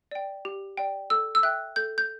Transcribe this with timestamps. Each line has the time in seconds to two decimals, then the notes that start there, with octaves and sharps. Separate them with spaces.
0.11 D5 G5
0.45 G4
0.77 D5 G5
1.10 A4 E6
1.35 E6
1.43 E5 G5 F#6
1.76 A4 G6
1.98 G6